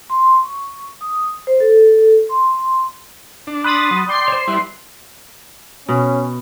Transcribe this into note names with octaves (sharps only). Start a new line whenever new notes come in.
C6
C#6
D#6
C5
A4
C6
D4
B5 C6 D#6 F#6 A6
F#3
D5 G5 C6 C7
C5 C#5
G3 E4 B4 D5 E5
B2 C#4